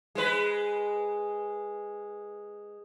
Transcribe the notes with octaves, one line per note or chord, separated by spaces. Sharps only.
G#3 B4